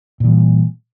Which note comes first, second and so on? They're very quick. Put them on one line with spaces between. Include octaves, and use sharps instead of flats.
A#2 E3 G3